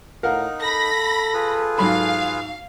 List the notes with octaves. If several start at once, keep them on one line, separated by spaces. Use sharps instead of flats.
A2 D#4 A#4 F5 F#5
A4 B5 A#6
F4 G#4 B4
G#2 F#3 F5 B5